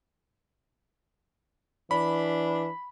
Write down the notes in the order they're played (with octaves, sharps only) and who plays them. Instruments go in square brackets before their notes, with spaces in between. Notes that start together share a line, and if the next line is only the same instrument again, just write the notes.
[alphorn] E3 [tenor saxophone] D4 [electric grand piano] B5